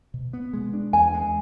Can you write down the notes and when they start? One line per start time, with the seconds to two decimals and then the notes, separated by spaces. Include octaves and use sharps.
0.14 B2
0.33 B3
0.53 G#3
0.73 D4
0.93 E2 G#5
1.14 G#3